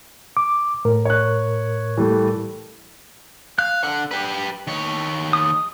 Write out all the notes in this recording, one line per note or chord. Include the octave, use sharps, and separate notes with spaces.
D6
A2 A#4
C#5 F#6
E3 G3 A3
F5 F#6
D3 F#5
G4 B4
D#3 C#5
D#6